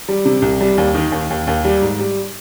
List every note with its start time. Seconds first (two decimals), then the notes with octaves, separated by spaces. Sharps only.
0.08 G3
0.25 C3
0.42 C2
0.61 G3
0.77 D#2
0.95 D#3
1.12 D#2
1.30 D#2
1.47 D#2
1.65 G3
1.82 G#2
1.99 G3